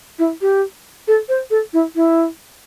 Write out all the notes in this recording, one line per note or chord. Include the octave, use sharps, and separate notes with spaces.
E4
G4
A4
C5
A4
E4
E4